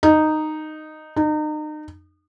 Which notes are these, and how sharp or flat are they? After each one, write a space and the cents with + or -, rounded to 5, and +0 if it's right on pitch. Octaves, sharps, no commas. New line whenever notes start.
D#4 -10
D#4 -35